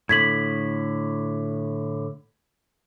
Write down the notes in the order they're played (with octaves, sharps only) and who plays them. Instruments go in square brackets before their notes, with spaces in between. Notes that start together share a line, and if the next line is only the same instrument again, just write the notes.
[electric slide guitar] A2 D3 [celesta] G#6 B6 F#7